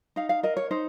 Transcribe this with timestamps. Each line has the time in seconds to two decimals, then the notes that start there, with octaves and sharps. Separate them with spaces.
0.16 D#4 F5
0.29 F5
0.43 A#4 D#5
0.57 C#5
0.71 D#4 C5